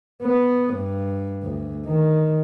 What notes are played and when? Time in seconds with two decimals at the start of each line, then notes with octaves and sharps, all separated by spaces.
0.23 B3
0.75 G2
1.43 D2
1.87 D#3